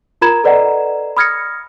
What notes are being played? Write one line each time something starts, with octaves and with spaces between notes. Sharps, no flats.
F4 A#4 A#5 B5 G#6 E7
A4 B4 D5 D#5 F#5 A#5
B5 D#6 F6 G#6 A#6 C#7